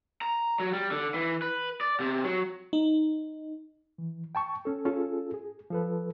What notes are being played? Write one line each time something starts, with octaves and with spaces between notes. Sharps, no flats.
A#5
F#3
G3
D3
E3
B4
D5
C3
F#3
D#4
E3
G5 A5 C#6
C#4 A4
C#4 F4 G#4 A4
G#4
F3 A4 B4